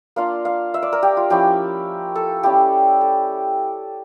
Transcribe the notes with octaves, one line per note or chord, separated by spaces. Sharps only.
A#3 D4 F4 F5
F5
E5
D5
A#4
G4
F4
F3 C#4 E4 G4
A4
G3 C#4 E4 G4
A4